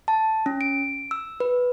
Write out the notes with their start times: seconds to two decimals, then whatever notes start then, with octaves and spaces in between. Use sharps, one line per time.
0.08 A5
0.46 C#4
0.61 D7
1.11 E6
1.40 B4